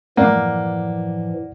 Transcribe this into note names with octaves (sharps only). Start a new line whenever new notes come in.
F#2 A2 E3 F3 A#3 D5 F#5